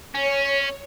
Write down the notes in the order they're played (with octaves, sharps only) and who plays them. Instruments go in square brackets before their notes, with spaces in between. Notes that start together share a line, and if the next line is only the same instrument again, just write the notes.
[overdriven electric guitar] C#4 [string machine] C#5